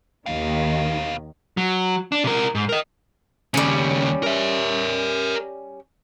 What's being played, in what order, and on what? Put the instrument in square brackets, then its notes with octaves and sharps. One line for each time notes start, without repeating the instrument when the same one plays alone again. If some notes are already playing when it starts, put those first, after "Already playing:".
[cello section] D#2 D#3 [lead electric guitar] B2 F5
[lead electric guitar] F#3
D4
C3 A#4
G#2
A#4 D#5
[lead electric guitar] D#2 C#3 [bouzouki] G3 C#4
[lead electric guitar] A#4 E5